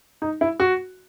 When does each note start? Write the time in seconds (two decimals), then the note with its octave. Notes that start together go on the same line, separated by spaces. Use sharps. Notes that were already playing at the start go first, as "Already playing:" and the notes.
0.22 D#4
0.41 E4
0.60 F#4